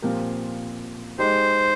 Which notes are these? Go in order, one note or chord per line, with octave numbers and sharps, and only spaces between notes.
A#2 F3 C4 G4 A#4
G#3 D#4 G4 C5